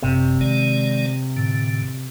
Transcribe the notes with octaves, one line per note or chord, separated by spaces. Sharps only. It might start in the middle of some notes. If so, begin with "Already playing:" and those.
G1 F#2 C3
D#3 G#3 D5
A2 D3